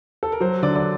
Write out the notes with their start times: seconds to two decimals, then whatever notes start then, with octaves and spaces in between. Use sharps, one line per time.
0.23 A4
0.32 A#4
0.40 F#3 C5
0.63 D3 D5
0.76 D5